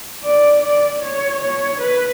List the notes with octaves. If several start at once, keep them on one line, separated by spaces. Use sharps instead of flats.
D5
D5
C#5
C#5
B4